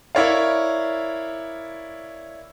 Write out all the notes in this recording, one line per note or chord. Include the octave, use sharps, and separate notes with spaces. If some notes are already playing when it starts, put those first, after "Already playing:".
E4 A#4 C#5 D5 F5